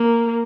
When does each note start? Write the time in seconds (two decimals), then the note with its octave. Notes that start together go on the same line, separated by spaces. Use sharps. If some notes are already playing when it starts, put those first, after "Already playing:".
Already playing: A#3